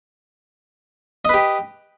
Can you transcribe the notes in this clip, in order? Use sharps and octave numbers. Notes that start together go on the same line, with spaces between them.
G4 B4 D#5